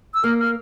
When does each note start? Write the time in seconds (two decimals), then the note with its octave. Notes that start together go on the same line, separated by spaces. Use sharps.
0.14 E6
0.24 A#3 F6
0.39 F6